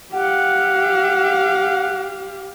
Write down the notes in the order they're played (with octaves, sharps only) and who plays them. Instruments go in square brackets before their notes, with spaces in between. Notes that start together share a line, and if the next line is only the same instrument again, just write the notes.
[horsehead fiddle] G4 F5 [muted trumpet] F#5